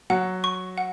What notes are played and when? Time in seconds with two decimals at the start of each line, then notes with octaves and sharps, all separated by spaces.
0.10 F#3 F#4 F#5
0.44 C#6
0.78 F#5